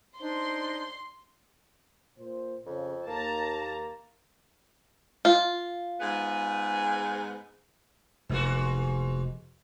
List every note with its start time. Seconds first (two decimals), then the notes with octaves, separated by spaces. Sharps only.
0.19 D4 D#4 C5 C6
2.17 A#2 C5
2.66 F2 C#3
3.07 D#2 A#3 A5 A#5
5.25 F4
6.00 G#2 B3 G#4
8.29 F1 G#2 A#3 F#4